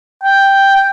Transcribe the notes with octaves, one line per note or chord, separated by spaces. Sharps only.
G5